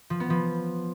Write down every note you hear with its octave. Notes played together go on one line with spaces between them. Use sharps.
F3
B3
F3